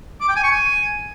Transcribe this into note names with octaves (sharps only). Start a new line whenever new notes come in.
D6
G5
G#5
C#6
G#5